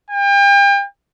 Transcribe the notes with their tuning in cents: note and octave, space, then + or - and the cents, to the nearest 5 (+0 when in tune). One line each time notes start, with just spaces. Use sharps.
G5 +40